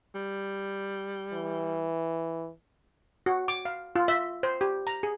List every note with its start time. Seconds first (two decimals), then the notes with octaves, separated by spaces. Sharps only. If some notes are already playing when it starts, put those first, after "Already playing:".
0.15 G3
1.33 E3
3.26 F#4
3.48 D6
3.65 F5
3.96 F4
4.08 E5
4.43 C5
4.61 G4
4.87 A#5
5.03 G#4